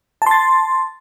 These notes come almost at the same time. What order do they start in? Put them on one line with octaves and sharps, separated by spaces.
A5 C6 A6